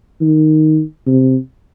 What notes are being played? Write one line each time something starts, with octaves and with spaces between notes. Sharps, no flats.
D#3
C3